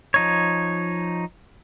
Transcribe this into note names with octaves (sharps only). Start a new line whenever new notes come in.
F3 D#4 C#5